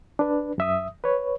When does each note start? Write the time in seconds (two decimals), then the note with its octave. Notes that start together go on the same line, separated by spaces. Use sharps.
0.19 D4 B4
0.58 F#2 E5 D#6
1.04 B4 C#5